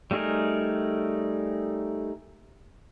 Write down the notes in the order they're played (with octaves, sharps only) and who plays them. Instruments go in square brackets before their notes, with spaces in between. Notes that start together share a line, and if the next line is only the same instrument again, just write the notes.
[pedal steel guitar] G3 A3 D#4 G#4 A#4